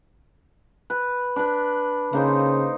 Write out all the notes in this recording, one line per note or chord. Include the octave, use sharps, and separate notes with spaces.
B4
D4 B4
C#3 A#3 D#4 C5